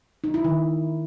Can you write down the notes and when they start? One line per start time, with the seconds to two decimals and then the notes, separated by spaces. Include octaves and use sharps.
0.24 D#4
0.34 E4
0.44 D#3